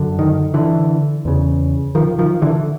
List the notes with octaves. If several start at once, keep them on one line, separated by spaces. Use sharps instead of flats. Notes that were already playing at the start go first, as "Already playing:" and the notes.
Already playing: F#2 D3
D#3
D3 E3
E2 C#3
D#3 F3
D#3 F3
D3 E3